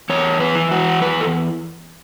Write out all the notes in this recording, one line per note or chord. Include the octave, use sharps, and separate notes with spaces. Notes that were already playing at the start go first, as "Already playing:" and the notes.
E2 C#5
B4
E3
F#4
E2 B4
A4